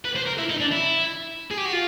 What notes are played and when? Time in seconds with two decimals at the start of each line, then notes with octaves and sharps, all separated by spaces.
0.05 B4
0.16 C5
0.27 A#4
0.39 E4
0.50 D#4
0.61 D4
0.72 E4
1.51 G#4
1.57 G4
1.65 F#4
1.73 F4